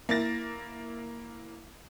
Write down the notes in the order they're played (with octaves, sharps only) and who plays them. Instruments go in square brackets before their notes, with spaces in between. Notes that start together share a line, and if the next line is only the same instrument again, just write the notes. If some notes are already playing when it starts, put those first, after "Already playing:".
[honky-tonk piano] A#3 E4 A6 A#6